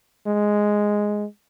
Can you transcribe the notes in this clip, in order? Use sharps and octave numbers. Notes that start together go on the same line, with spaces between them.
G#3